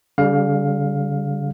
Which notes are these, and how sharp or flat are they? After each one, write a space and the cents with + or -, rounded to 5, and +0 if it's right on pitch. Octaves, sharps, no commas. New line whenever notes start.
D3 -45 G3 +0 F5 +15